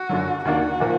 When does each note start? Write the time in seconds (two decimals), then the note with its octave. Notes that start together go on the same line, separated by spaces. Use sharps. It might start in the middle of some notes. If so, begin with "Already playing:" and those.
Already playing: F#4
0.09 F#2 D3 F#3
0.45 D#2 D#3 A#3 D4 F#4
0.80 A#2 F3 A#3